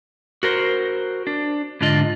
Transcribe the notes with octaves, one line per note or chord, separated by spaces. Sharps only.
F#4 A#4 C5
D4
G#2 D3 D4 F4 D#5